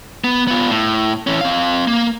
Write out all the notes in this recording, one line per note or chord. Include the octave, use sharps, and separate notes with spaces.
B3
B3 F4
A2
E3 C#4
C4 F5
A#3